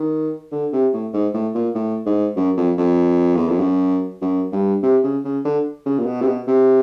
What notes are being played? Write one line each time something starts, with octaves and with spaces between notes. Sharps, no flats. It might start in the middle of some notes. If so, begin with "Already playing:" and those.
Already playing: D#3
D3
C3
A2
G#2
A2
A#2
A2
G#2
F#2
F2
F2
E2
F2
F#2
F#2
G2
C3
C#3
C#3
D3
C#3
A#2
B2
C3
B2
C3